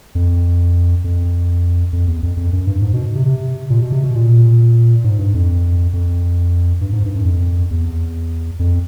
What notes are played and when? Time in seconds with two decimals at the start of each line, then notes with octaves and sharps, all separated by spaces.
0.15 F2
1.04 F2
1.93 F2
2.07 E2
2.23 F2
2.37 F2
2.53 F#2
2.67 G2
2.82 G#2
2.93 B2
3.15 C3
3.25 C3
3.70 A#2
3.82 B2
3.92 C3
4.04 B2
4.15 A#2
5.04 G#2
5.19 G2
5.34 F2
5.93 F2
6.81 G2
6.93 G#2
7.04 G2
7.15 F#2
7.25 F2
7.71 E2
8.59 F2